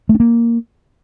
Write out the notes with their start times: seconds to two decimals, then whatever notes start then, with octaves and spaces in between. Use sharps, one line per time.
0.09 A3
0.15 D4
0.20 A#3